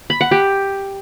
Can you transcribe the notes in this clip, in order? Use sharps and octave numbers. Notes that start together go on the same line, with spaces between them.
B5
F#5
G4